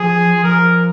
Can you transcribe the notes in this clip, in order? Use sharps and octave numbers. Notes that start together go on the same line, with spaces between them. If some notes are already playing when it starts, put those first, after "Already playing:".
Already playing: F3 G#4
F3 A#4